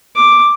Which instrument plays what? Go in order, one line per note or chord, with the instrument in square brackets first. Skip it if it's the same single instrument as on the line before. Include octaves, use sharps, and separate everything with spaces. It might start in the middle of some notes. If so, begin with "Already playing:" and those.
[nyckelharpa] D6